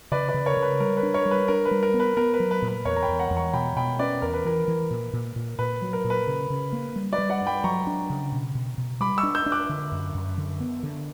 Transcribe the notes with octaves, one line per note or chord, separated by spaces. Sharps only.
C#3 B4 D5
B4 D5
C#3
A#4 C#5
C#3
B4
G3 A#4
B4
D4
A#4 C#5
G3
B4
D4 A#4
B4
G3
A#4
B3
B4
B3 A#4
B4
F#3
B4
A#2
B4
E2 A#4 C#5
A#5
G5 B5
E2
F#5 A#5
E2
A#5 C#6
B2 G5 B5
B2 G5 B5
C#4 B4 D5
E2 A#4
B4
E3 A#4
E3
A#2
A#2
A#2
A#2 B4
F#3
A#4
A#2
B4
C#3
C#3
A#3
G3
B4 D5
G3
D5 F#5
G2
G5 B5
F#3 A#5 C#6
D4
C#3
B2
B2
B2
G3 B5 D6
C#6 E6
D4
E6 G6
D4
D6 F#6
D3
F#2
F#2
D3
B3
D3